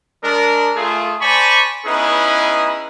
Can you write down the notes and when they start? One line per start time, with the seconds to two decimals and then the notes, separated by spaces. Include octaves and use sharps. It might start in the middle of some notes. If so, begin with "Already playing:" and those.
0.24 G#3 D4 A#4
0.76 A3 F4 G#4
1.21 C5 D5 G#5 A5 B5 C#6
1.86 B3 C#4 D#4 E4 G#4 B4